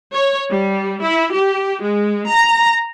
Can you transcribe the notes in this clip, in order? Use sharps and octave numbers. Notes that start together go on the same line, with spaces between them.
C#5
G3
E4
G4
G#3
A#5